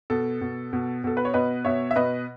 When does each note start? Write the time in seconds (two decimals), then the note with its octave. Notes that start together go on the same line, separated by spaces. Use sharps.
0.10 B2 A4
0.41 B2
0.73 B2
1.04 B2 A4
1.17 B4
1.25 C#5
1.34 B2 B4 D#5
1.65 B2 C#5 E5
1.91 E5
1.96 B2 B4 D#5